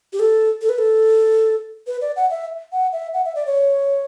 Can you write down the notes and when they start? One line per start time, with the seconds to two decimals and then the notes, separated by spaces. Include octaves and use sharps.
0.13 G4
0.19 A4
0.61 A4
0.69 B4
0.78 A4
1.87 B4
2.01 D5
2.16 F#5
2.30 E5
2.72 F#5
2.93 E5
3.14 F#5
3.25 E5
3.36 D5
3.46 C#5